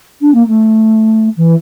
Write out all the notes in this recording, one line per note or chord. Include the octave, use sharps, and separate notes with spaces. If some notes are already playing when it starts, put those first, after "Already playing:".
D4
A#3
A3
E3